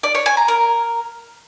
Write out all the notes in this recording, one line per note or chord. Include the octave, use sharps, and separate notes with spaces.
D5
C#5
G#5
A#5
A#4